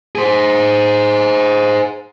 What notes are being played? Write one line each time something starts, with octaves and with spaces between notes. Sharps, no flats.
G#4 C5